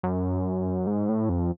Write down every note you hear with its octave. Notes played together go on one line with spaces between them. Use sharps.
F#2
G#2
A2
F2